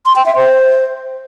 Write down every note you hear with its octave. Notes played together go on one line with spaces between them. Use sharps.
C6
G5
E5
C5